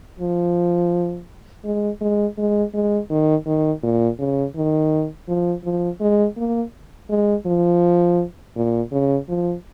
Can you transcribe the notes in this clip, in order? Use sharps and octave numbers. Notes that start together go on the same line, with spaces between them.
F3
G#3
G#3
G#3
G#3
D#3
D#3
A#2
C#3
D#3
F3
F3
G#3
A#3
G#3
F3
A#2
C#3
F3